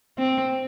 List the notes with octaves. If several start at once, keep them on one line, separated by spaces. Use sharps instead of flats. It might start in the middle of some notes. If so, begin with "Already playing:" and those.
C4